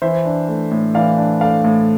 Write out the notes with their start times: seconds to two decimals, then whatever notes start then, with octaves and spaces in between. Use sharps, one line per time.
0.02 E3 C5 E5
0.25 D4
0.49 A3
0.71 A2
0.94 E3 D5 F5
1.18 D4
1.41 A3 D5 F5
1.64 A2